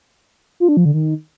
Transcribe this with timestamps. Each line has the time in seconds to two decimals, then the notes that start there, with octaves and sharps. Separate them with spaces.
0.60 F4
0.69 D4
0.77 F3
0.85 D3
0.94 D#3